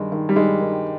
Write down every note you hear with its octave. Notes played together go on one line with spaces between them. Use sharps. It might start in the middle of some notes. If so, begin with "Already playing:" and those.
Already playing: G2 D#3 G#3
D#3
G3
G2 G#3
D#3